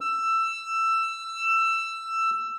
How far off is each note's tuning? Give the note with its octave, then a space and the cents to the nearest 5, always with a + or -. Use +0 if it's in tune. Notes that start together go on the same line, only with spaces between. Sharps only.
E6 +15